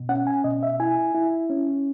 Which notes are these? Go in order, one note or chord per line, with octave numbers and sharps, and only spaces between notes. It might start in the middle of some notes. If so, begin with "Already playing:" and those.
Already playing: B2
C#4 F#5
G#5
B2 D#5
E5
E4 G#5
E4
C#4